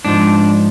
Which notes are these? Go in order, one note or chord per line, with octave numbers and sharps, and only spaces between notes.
G#2 F3 D4